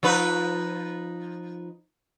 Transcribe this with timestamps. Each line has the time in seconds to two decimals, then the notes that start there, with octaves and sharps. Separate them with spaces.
0.03 F3 D#4 B4